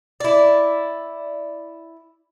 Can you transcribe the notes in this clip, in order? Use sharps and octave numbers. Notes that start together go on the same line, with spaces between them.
E4 D5